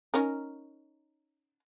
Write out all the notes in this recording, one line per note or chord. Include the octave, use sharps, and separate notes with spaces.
C#4 D#4 A#4